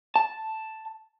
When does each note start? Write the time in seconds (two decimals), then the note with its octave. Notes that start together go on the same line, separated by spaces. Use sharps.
0.16 A5